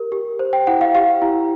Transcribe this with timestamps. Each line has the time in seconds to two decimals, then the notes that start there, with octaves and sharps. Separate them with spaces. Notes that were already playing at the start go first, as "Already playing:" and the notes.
Already playing: G4 A#4
0.12 G4
0.39 C5
0.53 G5
0.67 E4 F#5
0.81 F5
0.95 G4 F5
1.22 E4